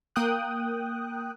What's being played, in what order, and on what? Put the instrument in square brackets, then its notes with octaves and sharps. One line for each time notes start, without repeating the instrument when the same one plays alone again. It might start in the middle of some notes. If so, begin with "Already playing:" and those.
[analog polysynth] A#3 G5 D#6 F#6